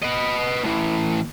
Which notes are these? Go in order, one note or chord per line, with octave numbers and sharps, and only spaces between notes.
B4 D#5
A2 E3